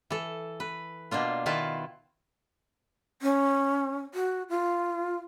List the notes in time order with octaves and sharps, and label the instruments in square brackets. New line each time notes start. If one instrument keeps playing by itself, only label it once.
[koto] E3 A4
B4
B2 A#3 D4 F4
D#3 E4 F4 B4 A5
[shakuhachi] C#4
F#4
F4